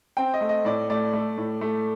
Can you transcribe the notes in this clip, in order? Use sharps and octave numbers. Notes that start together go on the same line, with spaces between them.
C4 G5
D#5
A3
D#5
A2 D5
A3 D5
A3
A2
A3